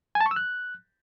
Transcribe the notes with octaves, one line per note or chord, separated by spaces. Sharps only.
G#5
A5
C#6
E6
F#6